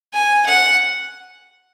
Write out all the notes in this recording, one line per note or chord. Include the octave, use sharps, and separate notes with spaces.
G#5
F#5